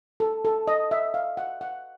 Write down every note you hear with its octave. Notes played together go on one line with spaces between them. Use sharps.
A4
A4
D#5
E5
F5
F#5
F#5